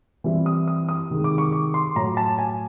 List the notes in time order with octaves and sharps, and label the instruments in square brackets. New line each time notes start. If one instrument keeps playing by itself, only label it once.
[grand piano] E3 G3 C4 E4
D#6
D#6
D#6
C3 D#3 G#3
D6
C#6
C#6
C6
A2 F#3 A3 A#5
A5
G#5